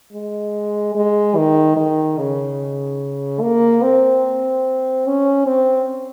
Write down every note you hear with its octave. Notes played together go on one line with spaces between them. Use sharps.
G#3
G#3
D#3
D#3
C#3
A#3
C4
C#4
C4